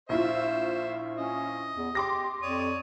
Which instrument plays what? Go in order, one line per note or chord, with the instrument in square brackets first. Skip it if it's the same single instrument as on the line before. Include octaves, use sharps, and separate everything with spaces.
[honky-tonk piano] A#1 E4 F4 [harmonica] C5 E5
[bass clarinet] C#4 [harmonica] D#5
[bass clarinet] E2
[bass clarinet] G4 [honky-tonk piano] C6 D6 A#6
[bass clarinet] F2 [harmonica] C#5 D5 D#6